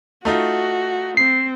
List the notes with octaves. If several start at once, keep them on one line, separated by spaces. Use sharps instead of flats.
A3 D#4 F4 F#4
C4 C7